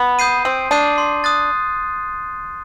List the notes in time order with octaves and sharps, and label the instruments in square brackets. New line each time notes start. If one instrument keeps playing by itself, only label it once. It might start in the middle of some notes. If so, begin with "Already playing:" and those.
Already playing: [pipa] B3
[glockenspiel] D#6 G6 C7 D#7
[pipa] C4 [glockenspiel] C6
[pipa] D4 [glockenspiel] D#6 G6 C7 D#7
[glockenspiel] C6
D#6 F#6 A6